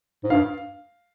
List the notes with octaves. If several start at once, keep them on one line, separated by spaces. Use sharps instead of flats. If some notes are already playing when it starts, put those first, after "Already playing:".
G#2
G2 F5